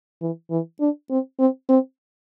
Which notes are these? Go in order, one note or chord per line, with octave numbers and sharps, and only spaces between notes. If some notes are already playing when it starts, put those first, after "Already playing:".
E3
E3
D4
C4
C4
C4